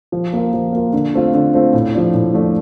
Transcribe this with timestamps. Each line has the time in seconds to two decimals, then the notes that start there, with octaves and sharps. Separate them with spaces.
0.12 F3
0.33 A#3 F4
0.53 F3
0.72 A#3 F4
0.93 D3
1.14 A3 C4 F4
1.34 D3
1.54 A3 C4 F4
1.73 A2
1.94 F3 A3 D4
2.14 A2
2.34 F3 A3 D4